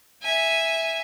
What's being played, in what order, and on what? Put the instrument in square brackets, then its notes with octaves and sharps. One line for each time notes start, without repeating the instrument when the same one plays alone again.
[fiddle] E5 G#5